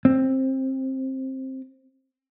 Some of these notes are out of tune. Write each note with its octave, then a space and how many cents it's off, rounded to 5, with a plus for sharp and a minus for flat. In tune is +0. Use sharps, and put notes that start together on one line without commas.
C4 +15